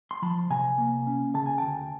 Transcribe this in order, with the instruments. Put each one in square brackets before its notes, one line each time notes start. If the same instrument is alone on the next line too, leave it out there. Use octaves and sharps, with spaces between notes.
[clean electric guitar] C6
F3 A5 B5
C3 G#5 A#5
A#3
C#4
C#3 A5
G#5
D2 G5 A5